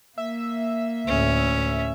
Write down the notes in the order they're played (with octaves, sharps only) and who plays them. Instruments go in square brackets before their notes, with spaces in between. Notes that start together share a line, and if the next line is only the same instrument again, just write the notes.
[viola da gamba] A#3 [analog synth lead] E5
[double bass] D2 A2 [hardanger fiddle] C#4